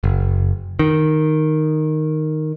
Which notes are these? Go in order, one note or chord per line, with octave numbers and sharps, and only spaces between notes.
F#1
D#3